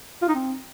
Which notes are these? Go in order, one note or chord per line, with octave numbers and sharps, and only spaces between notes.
F4
D#4
C4